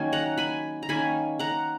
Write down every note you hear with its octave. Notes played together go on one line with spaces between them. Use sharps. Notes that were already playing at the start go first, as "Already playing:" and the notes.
Already playing: D#3 F#3 A#3 C#4 G#5
F#5 A#5
G#5 B5
A#5
D#3 A#3 C#4 G#5 B5
F#5 A#5